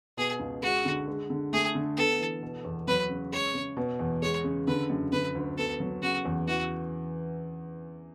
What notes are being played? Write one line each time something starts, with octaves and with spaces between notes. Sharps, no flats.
B2 G#4
C#2
G#3 F#4
D3
G#3
D3
A3 G#4
D3
B3 A4
E3
B2
E2
F#3 B4
C#3
G#3 C#5
C#3
B2
E2
G#3 C#5
C#3
D3 B4
F#2
D3 B4
D2
B3 A4
F#3
C#3 F#4
E2
E3 F#4